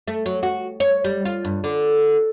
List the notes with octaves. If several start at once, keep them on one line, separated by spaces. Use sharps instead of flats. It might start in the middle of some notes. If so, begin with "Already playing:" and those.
A3
F#3
F#4
C#5
G3
F4
G2
D3